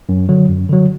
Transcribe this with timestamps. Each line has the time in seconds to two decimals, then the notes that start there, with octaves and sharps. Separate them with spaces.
0.09 F#2
0.29 D3 F#3
0.49 F#2
0.69 D3 F#3